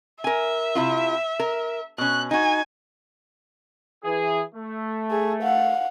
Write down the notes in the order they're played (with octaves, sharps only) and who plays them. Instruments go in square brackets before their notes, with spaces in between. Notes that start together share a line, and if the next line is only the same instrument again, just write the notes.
[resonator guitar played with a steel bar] A#4 G#5 [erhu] E5
[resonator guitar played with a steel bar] C3 E4 F4
A#4
[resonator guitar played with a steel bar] B2 C#4 [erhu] F#6
[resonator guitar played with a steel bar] D#4 F#4 [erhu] G#5
[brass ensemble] E3 G#4
A3
[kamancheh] G#4
F5 F#5